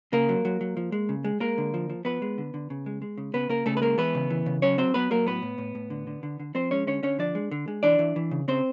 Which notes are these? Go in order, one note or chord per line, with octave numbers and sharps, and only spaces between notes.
C#3 A#3 A#4
F#3
F#3
F#3
F3
G#3
C#3
G#3
G#3 A#3 A#4
D3
F3
F3
F3 B3 B4
G#3
D3
D3
C#3
G#3
G#3
C#3
C#3 B3 B4
C#3 A#3 A#4
C#3 A3 A4
B4
G#3 A#3 A#4
E3 B3 B4
C#3
E3
C#3
F#3 C#4 C#5
F#3 C4 C5
F#3 B3 B4
F#3 A#3 A#4
A2 B3 B4
A2
A2
A2
D3
D3
D3
D3
F3 C4 C5
G#3 C#4 C#5
D3 C#4 C#5
D3 C#4 C#5
F3 D4 D5
G#3
D3
G#3
E3 D4 D5
E3
E3
C#3
C#3 C4 C5